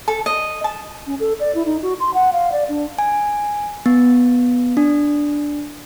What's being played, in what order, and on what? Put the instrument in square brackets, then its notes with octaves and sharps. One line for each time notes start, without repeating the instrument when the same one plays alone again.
[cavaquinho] A4
D#5
A5
[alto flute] C#4
A4
D5
E4
D#4
F#4
C6
F#5
F5
D5
D4
[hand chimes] G#5
B3
D4